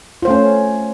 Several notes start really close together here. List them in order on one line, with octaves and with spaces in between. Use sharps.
F4 C5 A3 C#4